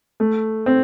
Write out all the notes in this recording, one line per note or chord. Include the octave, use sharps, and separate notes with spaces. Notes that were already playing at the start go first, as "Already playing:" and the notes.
A3
C4